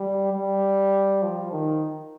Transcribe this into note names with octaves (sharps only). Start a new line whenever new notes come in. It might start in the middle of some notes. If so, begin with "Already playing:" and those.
Already playing: G3
G3
F3
D#3